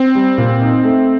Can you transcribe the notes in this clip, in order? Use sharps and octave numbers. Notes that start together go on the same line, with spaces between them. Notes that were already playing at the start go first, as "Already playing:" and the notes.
Already playing: C4
G3
A#2
D#4
A3